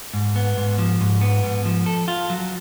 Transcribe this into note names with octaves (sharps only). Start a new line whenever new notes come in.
G#2
B3
G#2
F3
G#2
B3
G#2
F3
A4
F4
F#3